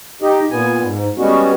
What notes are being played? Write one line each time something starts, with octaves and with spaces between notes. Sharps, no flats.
D#4 G4 D#5
A#2 B3 G#5
G#2
G3 G#3 B3 C#4 F#4